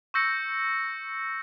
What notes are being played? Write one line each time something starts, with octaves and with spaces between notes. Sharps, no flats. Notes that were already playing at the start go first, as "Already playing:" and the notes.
C#6 E6 G6 A#6 C#7